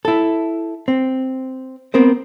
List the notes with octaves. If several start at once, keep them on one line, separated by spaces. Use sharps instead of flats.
E4 A4
C4
B3 C4 A#4 C5